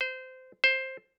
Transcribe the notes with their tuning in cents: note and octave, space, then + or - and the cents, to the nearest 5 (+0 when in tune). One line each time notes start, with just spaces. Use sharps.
C5 -20
C5 +10